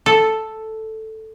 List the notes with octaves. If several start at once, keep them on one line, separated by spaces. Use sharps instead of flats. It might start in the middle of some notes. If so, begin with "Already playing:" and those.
A4